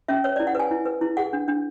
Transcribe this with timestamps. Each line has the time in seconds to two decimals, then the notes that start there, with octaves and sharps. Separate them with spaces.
0.08 C#4 E5
0.24 B4 C#5
0.36 E4 D5
0.47 F#5
0.55 B4 G#5
0.71 E4
0.86 B4
1.01 E4
1.17 G#4 F#5
1.33 D4
1.48 D4